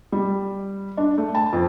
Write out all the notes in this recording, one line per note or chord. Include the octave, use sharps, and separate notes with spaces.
G3
D4
A3
A5
F2